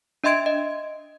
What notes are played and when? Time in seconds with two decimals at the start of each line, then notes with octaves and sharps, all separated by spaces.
0.24 D4 D#5 E5 C6 G#6 D7
0.46 D#5